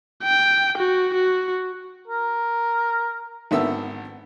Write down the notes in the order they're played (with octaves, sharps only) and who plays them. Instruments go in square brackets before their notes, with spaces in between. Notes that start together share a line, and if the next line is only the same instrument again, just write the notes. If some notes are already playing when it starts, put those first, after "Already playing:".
[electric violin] G5
F#4
F#4
[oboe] A#4
[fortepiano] G#1 D3 A#3 B3 E5 E6